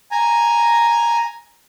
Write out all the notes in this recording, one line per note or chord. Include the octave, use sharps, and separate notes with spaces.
G#5 A#5